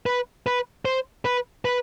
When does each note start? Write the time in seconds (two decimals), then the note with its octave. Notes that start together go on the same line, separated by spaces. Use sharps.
0.06 B4
0.47 B4
0.85 C5
1.25 B4
1.65 B4